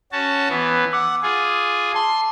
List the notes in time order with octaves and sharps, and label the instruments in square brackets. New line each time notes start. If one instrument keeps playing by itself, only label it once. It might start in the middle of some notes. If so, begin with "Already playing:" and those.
[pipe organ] C#4 F#4 A5
E3 B3
[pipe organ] F#5 [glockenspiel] D6 E6
[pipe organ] F4 G#4
[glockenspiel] A5 [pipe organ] C6